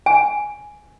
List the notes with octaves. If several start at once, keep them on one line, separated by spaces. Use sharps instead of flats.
G#5